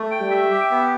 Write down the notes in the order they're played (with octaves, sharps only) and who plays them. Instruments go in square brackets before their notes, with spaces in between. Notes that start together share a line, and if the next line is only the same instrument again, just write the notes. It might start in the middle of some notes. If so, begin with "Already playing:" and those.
Already playing: [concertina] A3
G5
[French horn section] G3
[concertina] E5
G4
B3